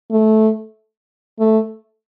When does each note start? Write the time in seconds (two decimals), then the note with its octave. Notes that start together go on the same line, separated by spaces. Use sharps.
0.11 A3
1.40 A3